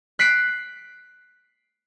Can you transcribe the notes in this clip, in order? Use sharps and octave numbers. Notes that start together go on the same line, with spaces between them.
F#6 B6 C7 D7